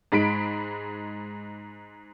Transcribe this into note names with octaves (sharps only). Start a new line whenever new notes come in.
G#2 G#3 B5 B6 D7